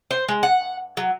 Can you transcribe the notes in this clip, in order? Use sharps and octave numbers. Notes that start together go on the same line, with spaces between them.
C5
G#3
F#5
F#3